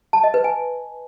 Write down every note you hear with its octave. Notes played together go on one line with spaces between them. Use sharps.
A5
D#5
B4
G#5